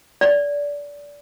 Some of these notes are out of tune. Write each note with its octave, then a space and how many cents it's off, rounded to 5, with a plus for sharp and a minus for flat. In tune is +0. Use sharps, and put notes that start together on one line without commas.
D5 -25